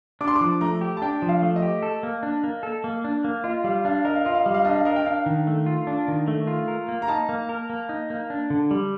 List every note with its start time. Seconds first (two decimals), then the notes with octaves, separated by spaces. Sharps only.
0.21 D4 D6
0.28 C6
0.36 D6
0.41 F3
0.61 A3 A#5
0.81 G4
0.97 A5
1.02 D4 G5
1.22 F3
1.29 F5
1.42 A3
1.56 D#5
1.62 G4
1.82 A4
2.03 A#3
2.23 D4
2.44 A#3
2.63 A4
2.84 A#3
3.04 D4
3.24 A#3
3.44 F4 D#5
3.64 G3 F5
3.85 D4 F5
4.05 A#4 D#5
4.15 F5
4.25 F4 D#5
4.35 F5
4.44 G3 D#5
4.54 F5
4.65 D4 D#5
4.75 F5
4.85 A#4 D#5
4.96 G5
5.06 D4 F5
5.26 D#3
5.47 A3
5.66 F4
5.87 D4
6.08 D#3
6.28 A3
6.47 F4
6.68 A#4
6.88 A#3
7.02 A#5
7.08 D#4 A5
7.29 A#3
7.49 A#4
7.70 A#3
7.89 D#4
8.10 A#3
8.30 D4
8.50 D3
8.71 G3